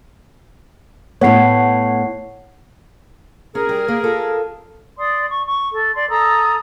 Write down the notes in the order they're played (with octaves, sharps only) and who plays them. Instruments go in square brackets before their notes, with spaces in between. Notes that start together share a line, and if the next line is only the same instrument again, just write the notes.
[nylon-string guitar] A2 B3 [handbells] C#5 F#5 C7
[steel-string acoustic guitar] C#4 [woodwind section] G#4 A#4
[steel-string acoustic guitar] G3
A#3
F4 A4
[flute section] D5 C6 D#6
C#6
C#6
A4
D5 C6
A4 A#5 D#6 E6